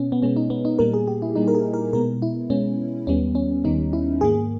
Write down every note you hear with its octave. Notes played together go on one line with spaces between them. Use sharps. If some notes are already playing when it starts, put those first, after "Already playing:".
Already playing: B2 B3 C#4
B3
B2 G#3 B3 C#4
D#4
B3
D#4
A#2 G3 A#3 A#4
G#4
G4
E4
A#2 G3 A#3 D#4
A#4
G#4
A#4
B2 G#3 B3 A#4
E4
B2 G#3 B3 C#4
D#2 D#3 G3 B3 C#4
C#4
D#2 D#3 G3 B3 D#4
E4
G#2 D#3 A#3 G#4